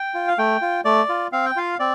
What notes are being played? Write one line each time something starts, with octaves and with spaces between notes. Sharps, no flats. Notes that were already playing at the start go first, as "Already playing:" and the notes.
Already playing: G5
F4
F5
A3 G5
F4
A3 D5
F4
C4 F5
G5
F4 F5
C4 D5